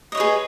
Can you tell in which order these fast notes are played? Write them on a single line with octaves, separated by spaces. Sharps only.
D#5 C#5 B4 G#4